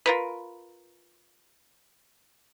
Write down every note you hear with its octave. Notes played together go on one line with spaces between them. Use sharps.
F4 A#4 B4